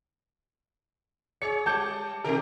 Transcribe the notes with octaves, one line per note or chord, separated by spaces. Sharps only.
G#4 C#5 C#7
G3 A5 G6 G#6
B2 D#3 G4 A#4